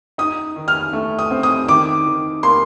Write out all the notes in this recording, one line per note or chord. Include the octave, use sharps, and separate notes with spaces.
D#4 D#6
D#3
F6
A3
D#6
C4
D#6
D#3 D6
D#3
A#3 C6